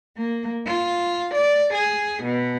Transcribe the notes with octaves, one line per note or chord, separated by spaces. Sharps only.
A#3
F4
D5
G#4
B2